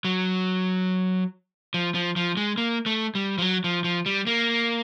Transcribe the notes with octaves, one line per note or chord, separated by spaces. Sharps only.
F#3
F3
F3
F3
G#3
A#3
A3
G3
F3
F#3
F3
F3
G3
A#3